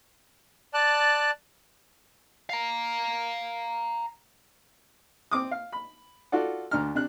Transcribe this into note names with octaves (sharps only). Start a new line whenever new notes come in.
D5 A5 F#6
F5 A#5
C4 D6 D#6
F5
B5
F4 F#4 A4 D5 F#5
D2 D4 A#5 F6
C3 D4 F#6